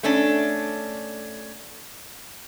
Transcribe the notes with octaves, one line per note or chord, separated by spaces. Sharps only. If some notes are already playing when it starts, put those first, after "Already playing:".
A3 C#4 D4